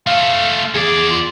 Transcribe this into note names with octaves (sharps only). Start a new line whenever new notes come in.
A3 F4 F5
E2 G#4 D5
F4